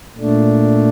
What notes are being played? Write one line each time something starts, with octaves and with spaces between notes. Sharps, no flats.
A#2 A3 D4